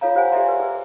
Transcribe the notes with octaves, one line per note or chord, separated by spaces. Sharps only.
F4 A4 C#5 F5 A#5
G4 C5 F5 F#5 G#5
G4 A4 D5 E5 A#5 C6
B4
G#4